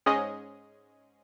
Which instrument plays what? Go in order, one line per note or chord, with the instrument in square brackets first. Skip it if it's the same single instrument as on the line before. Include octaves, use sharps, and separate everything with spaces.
[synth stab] G#2 G#3 C#4 G#4 D#5